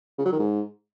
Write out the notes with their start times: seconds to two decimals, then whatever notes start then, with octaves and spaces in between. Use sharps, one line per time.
0.18 C#3
0.25 F#3
0.32 D#3
0.39 G#2